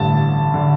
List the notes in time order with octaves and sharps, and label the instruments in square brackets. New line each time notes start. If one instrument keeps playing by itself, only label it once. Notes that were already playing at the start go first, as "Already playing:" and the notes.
Already playing: [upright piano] A1 G2 D3 [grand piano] A5
[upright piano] D3